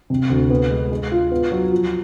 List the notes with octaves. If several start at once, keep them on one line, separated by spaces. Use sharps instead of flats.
C3
D2
B3
G#3
G#3
F4
B3
F#3
F3